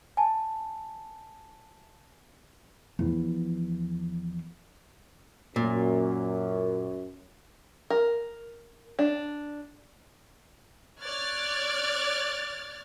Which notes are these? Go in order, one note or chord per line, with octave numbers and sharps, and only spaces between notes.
G#5 A5
E2 F3
F#2 A#2
A#4
D4
C#5 D5 F6 F#6 G#6 A6